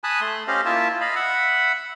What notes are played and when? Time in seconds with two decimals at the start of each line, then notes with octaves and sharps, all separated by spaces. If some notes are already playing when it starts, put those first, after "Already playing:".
0.04 G#5 A5 B5 D#6 F#6
0.21 A3 C6
0.48 C#4 G4 C5 D#5 F5
0.65 A#3 E4 F4 E5 A5
1.01 D#5 F5 B5
1.16 E5 F#5 B5